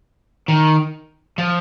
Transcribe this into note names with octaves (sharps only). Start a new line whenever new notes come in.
D#3
F3